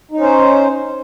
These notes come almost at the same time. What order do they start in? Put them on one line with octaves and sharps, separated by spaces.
D#4 C#4 C5